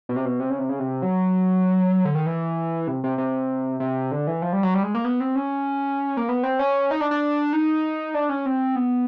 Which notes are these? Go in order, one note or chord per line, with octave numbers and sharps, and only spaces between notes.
B2
C3
B2
C3
C#3
C3
C#3
C3
F#3
D3
D#3
E3
C3
C3
C3
C3
D3
E3
F3
G3
F#3
G3
G#3
A#3
B3
C4
C#4
A#3
B3
C4
C#4
D#4
D4
D4
D#4
D4
C#4
C4
B3